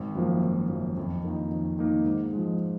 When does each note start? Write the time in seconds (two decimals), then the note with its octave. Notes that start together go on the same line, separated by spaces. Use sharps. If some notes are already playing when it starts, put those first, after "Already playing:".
Already playing: G#1
0.15 F#2 F3 A#3
0.42 G#1
0.69 F#2 F3 A#3
0.97 F2
1.24 D#3 A#3 D#4
1.51 F2
1.79 D#3 A#3 D#4
2.05 G#2
2.33 F3 G#3